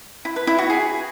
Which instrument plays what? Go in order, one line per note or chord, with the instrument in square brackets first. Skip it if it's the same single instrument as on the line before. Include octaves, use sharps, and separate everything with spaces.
[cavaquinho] E4
B4
E4
F#4
G#4